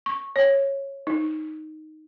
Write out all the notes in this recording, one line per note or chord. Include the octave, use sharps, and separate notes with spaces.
C#6
C#5
D#4